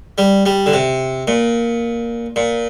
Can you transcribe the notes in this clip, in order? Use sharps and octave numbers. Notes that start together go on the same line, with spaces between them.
G3
G3
D3
C3
A#2
A#2